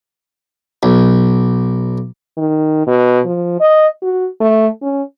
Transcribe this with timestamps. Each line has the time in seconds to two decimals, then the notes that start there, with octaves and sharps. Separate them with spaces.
0.83 B1
2.38 D#3
2.87 B2
3.26 F3
3.60 D#5
4.02 F#4
4.41 A3
4.82 C#4